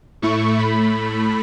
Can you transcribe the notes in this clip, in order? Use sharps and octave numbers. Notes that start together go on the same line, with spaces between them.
A2 A3 E4 C#6
A2 A3 B5